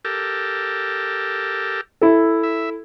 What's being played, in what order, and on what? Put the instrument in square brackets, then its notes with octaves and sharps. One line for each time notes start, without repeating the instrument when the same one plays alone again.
[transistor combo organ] G4 A4 A#4
[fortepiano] E4 A4
[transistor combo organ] E5